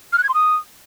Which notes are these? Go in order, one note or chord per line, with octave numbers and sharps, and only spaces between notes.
F6
F#6
G#6
C6
D#6